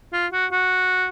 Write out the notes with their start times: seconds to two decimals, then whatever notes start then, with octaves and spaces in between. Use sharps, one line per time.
0.13 F4
0.32 F#4
0.52 F#4